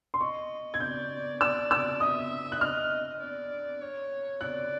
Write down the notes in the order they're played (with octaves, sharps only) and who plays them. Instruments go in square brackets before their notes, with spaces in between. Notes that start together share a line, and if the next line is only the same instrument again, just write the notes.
[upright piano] C6
[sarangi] D#5 [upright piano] C#6
[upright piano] G#6
[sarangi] D5 [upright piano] G6
[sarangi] D5 [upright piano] E6
[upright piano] E6
[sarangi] E5 [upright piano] D#6
[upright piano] F#6
[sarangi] D#5 [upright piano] F6
[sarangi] D5
C#5
[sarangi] D5 [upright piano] F#6